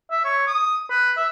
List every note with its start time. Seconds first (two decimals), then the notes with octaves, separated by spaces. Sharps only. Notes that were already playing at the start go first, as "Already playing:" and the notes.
0.11 E5
0.24 C#5
0.47 D#6
0.90 B4
1.17 E5